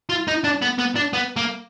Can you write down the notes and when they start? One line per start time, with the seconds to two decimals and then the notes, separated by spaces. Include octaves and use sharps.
0.09 F4
0.27 D#4
0.44 D4
0.62 B3
0.79 B3
0.96 D4
1.13 B3
1.36 A#3